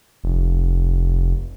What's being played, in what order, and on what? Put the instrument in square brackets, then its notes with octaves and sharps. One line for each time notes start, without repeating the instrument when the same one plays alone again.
[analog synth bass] F1